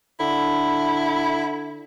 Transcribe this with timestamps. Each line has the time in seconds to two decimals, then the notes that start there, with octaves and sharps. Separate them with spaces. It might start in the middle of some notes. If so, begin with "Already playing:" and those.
0.20 D3 E4